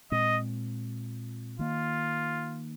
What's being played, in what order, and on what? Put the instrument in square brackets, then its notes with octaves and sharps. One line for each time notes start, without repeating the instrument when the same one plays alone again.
[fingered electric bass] A#2 G#3 C4 [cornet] D#5
[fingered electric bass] D#3 A#3 [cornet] F4